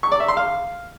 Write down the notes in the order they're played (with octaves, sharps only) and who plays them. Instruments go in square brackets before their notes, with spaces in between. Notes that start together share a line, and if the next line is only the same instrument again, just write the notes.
[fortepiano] C#6
D5
E5
C6
F5